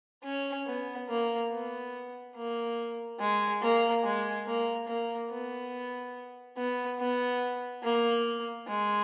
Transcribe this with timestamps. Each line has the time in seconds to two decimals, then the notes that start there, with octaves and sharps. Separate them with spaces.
0.24 C#4
0.66 B3
1.08 A#3
1.51 B3
2.35 A#3
3.19 G#3
3.61 A#3
4.04 G#3
4.46 A#3
4.88 A#3
5.30 B3
6.57 B3
6.99 B3
7.83 A#3
8.68 G#3